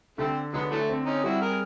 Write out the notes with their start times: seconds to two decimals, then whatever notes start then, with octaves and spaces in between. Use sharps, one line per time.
0.18 D3 G3 A3 C4
0.53 D3 F#3 G#3 B3
0.71 E3 F#3 A3
0.89 C4
1.06 C#4 D#4
1.24 G3 E4 F#4
1.41 G#4 A#4